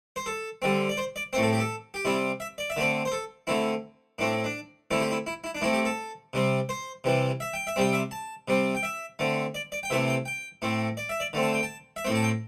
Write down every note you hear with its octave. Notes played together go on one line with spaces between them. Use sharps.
C5
A4
D3 G3 C4
D5
C5
D5
A2 A3 C4 C5
A4
G4
A4
G4
C3 G3 C4 E4
E5
D5
E5
D3 A3 C4 D5
C5
A4
D3 A3 C4 E4
A2 A3 C4 D4
D4
D3 A3 C4 E4
G4
E4
E4
E4
D4
A2 A3 C4 E4
G4
A4
C3 G3 C4
C5
C3 E3 G3
E5
G5
E5
C3 G3 C4 G5
E5
A5
C3 G3 C4
G5
E5
D3 A3 C4
D5
D5
G5
C3 E3 A3 C4 E5
G5
G5
A2 A3 C4
D5
E5
D5
D3 A3 C4
A5
G5
A5
E5
A2 A3 C4 G5
A5
G5